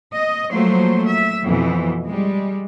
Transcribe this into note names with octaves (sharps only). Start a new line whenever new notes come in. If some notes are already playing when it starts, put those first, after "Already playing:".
D#5
F3 F#3 A3 A#3 C5
E5
F2 B2 E3
G3 G#3